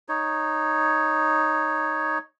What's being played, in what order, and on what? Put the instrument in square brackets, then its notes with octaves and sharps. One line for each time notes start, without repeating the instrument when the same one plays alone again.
[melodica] D#4 C#5